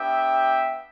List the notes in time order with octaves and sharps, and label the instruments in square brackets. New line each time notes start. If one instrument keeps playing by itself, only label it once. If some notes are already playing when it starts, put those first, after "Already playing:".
Already playing: [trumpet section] B3 D4 G4 E5 G5